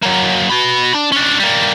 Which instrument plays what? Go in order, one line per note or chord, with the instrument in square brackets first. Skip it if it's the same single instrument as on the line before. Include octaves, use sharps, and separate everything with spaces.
[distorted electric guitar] F#3 A#3
F#4 B5
D4
C#4 D4
G3 A#3